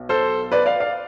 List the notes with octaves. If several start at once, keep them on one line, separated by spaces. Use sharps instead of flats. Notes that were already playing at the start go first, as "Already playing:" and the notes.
Already playing: B1 B2
A4 C5
B4 D5
D5 F5
D5 F5